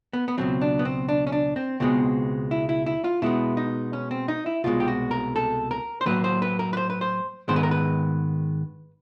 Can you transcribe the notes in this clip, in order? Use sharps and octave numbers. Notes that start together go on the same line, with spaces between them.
B3
B3
C#2 B2 F#3 C4
D4
B3
C4
D4
C#4
D4
C4
C#2 B2 G#3 B3 C4
E4
E4
E4
F4
B2 G#3 B3 E4
D#4
C#4
C4
D#4
E4
C2 B2 G#3 F4
G4
F#4
A#4
A4
A#4
C5
A2 F#3 A#3 B4
C5
B4
A#4
B4
C5
B4
C5
G#2 D#3 G#3 B3 C5
B4
A#4
B4